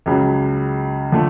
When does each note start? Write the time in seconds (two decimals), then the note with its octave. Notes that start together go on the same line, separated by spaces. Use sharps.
0.06 C#2 C#3 F#3
1.12 D3 F3 A3